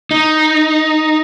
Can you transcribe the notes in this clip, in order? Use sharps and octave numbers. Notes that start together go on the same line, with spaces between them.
D#4